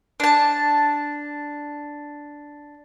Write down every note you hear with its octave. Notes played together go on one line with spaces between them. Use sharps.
D4 A5